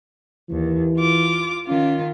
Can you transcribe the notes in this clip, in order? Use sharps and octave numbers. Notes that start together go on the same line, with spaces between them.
D#2 E3
F4 D6
D#3 C#4 F4